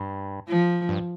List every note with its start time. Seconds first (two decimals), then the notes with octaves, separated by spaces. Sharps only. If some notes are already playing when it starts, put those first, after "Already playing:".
Already playing: G2
0.48 F3
0.89 G2